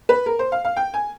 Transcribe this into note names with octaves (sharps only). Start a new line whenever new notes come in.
B4
A#4
C5
F5
F5
G5
G#5